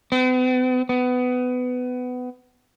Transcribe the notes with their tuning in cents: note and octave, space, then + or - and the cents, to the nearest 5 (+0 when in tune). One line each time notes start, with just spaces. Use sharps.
B3 +45
B3 +20